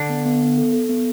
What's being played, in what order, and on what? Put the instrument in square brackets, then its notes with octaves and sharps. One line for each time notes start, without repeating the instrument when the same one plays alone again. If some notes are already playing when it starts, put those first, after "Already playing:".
Already playing: [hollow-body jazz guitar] D3 D4
[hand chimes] B3
B3
B3
A4
A4
B3